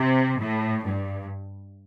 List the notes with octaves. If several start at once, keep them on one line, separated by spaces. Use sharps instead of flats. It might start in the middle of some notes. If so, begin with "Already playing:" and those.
Already playing: C3
A2
G2